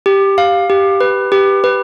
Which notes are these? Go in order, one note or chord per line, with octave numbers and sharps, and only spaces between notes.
G4
F5
G4
B4
G4
B4